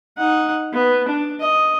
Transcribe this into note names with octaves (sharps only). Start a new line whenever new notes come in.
D#4 F#5
B3
D4
D#5